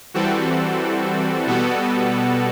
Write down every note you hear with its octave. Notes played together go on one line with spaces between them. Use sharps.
E3 G3 C4 F#4 A4
B2 G3 B3 F#4 A4